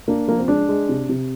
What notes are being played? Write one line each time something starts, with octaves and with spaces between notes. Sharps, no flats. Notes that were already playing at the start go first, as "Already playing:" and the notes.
A#3 D4
F3 A#3
C4
G#3 D4
G#3
C3
C3